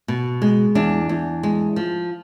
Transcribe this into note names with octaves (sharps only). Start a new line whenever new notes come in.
B2
G#3
E2 D4
E2
G#3
F3